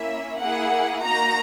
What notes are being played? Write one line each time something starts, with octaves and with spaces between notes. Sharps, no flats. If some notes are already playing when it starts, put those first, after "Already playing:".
Already playing: A#3 C#4 E4 E5
A#3 E4 G#4 F#5
A#3 D#4 F#4 A#5